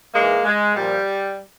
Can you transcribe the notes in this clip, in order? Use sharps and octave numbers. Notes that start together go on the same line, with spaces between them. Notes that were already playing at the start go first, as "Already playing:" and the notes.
G#2 E3 G#3 A#3
G#3
A#2 F3 G3